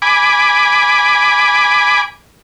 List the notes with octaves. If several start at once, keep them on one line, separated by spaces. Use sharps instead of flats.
G#5 B5 D6